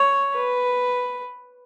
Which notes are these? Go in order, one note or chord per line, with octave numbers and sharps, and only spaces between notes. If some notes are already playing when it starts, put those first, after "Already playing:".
Already playing: C#5
B4